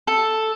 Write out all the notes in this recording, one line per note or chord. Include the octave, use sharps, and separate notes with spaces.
A4